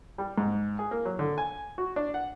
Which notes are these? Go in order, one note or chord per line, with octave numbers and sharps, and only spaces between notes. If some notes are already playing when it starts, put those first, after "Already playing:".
G3
G#2
G#4
A#3
F#3
D3
G#5
F#4
D4
F#5